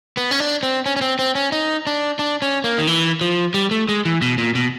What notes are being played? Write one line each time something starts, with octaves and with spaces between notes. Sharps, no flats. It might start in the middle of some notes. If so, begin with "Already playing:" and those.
B3
C#4
D4
C4
C#4
C#4
C4
C4
C#4
D#4
D4
D4
C#4
A#3
D#3
E3
F3
G3
A3
G#3
E3
B2
A#2
B2